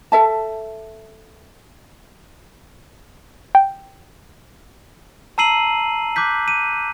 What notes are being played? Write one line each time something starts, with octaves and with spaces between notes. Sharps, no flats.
A4 E5 A5
G5
A5 A#5 E6 C7 D#7 F#7
D6 F#6 G6 B6
D#7